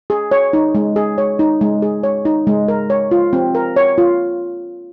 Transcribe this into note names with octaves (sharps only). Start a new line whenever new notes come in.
G#4
C#5
D#4
G#3
G#4
C#5
D#4
G#3
G#4
C#5
D#4
G#3
A#4
C#5
F4
C4
A#4
C#5
F4